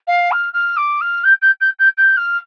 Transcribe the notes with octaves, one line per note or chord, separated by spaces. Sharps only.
F5
F6
F6
D6
F6
G6
G6
G6
G6
G6
F6